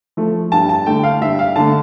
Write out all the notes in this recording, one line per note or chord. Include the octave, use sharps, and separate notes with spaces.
F3 A3
G2 A5
A5
D3 A3 G5
F5
G2 E5
F5
D3 A3 A5